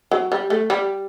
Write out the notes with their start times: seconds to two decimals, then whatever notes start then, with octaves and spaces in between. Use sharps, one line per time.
0.11 F#3
0.32 G3
0.50 A3
0.70 G3